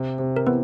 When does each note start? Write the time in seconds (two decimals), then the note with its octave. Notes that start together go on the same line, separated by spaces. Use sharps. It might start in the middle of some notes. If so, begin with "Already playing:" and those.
Already playing: C3
0.19 C3
0.36 A#4
0.47 E3 B3 B4